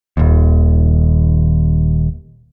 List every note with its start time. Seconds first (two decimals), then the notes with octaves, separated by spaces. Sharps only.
0.17 D#1 D#2